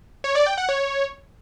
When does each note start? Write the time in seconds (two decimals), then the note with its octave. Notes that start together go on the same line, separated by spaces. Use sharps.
0.24 C#5
0.35 D5
0.46 G5
0.58 F#5
0.69 C#5